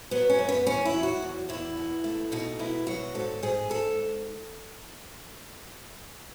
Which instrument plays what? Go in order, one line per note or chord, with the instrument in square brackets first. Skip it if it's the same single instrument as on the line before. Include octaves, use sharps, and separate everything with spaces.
[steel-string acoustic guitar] F#3 B3
C#4
F#2
B3
E2 C#4
E4
F#3
F#4
E2
E2 E4
B2
A3
B2 D#4
B2 E4
F#3 F#4
G#2 A4
G#2 G#4
G#2 A4